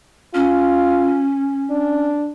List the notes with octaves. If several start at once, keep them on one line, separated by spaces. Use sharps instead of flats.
C#4 F4
D4